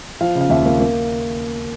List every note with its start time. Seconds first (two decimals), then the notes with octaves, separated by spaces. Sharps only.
0.21 F3 F5
0.35 C#3
0.41 F5
0.50 D#2 E5
0.66 A#3
0.80 A#3